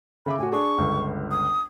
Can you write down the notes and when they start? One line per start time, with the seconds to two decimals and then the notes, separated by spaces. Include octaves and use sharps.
0.26 C#3 E5 B5 D6
0.38 A2 F#4 G#5
0.52 D4 G#4 C#6
0.78 G1 C#2
1.31 D#6